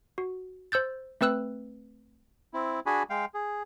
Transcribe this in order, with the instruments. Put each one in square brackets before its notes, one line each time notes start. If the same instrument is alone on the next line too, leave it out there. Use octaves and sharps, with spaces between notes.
[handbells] F#4
C5 E6 G6 A6
A3 C4 B4 E6 F#6
[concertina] C4 E4
D4 F#4 G#4 G#5 B5
G#3 F5 G5
G#4